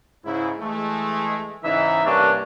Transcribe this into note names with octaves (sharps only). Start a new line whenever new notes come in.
G#2 C#3 E4
E3 G#3 A3
G#2 C#3 E3 D#4 E5
C2 G2 A#3 C#4 D4